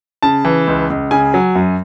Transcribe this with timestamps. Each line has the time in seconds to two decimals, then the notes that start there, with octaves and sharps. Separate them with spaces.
0.23 C#3 A5
0.45 E3
0.68 C#2
0.90 C#2
1.11 C#3 G#5
1.34 F#3
1.55 F#2